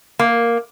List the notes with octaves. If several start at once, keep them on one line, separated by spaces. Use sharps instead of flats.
A#3